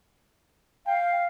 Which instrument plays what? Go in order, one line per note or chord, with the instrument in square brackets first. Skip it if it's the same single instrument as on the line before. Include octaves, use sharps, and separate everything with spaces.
[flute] F5 [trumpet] G5